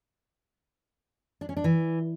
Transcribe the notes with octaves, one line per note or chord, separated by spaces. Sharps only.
D4
C#4
D4
E3